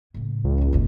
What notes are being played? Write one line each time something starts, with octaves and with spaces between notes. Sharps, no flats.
A2 C#3
C#2
D#2 G#2
F#1 B1